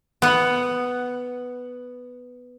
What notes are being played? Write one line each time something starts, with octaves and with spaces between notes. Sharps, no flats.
B3 F#5